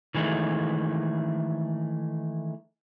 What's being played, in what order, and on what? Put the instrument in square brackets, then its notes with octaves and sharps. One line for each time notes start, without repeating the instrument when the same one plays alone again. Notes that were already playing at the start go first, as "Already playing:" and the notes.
[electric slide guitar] D#3 E3 G#3 A3